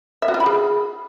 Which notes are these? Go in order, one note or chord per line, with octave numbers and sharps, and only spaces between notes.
E5
F#4
F4
B5
G#4